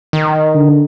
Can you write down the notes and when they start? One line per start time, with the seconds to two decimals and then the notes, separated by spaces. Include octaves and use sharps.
0.13 D#3
0.55 D3